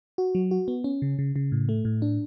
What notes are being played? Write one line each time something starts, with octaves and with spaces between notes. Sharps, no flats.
F#4
F#3
F#4
B3
C#4
C#3
C#3
C#3
A2
A3
A2
D4